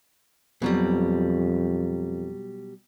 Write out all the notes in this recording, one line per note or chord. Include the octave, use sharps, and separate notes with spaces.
F2 B2 F#3 G3